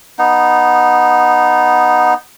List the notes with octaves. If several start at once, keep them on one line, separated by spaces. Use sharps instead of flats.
B3 D#4